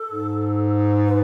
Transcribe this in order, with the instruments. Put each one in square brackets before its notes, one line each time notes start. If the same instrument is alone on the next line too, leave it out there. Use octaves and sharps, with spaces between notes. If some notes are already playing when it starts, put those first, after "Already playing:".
Already playing: [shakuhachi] A4
[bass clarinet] G#2
[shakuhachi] B4